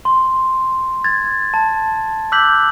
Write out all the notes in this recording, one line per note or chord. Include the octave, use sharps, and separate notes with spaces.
C6
G#6 A6
A5
D6 E6 F#6 G6 B6 F#7